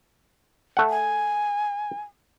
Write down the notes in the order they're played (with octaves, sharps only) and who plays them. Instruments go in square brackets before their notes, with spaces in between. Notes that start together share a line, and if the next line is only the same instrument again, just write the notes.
[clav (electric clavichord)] A3 F#5
[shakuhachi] G#5